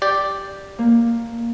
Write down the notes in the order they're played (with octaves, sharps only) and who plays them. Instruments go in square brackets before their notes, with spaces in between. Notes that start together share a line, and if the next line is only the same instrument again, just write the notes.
[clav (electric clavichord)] G4 D5
[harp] A#3